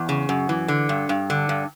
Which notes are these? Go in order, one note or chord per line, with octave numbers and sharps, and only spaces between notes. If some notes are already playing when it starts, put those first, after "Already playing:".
Already playing: E2
C#3
F#2
E3
D3
G2
G2
D3
G2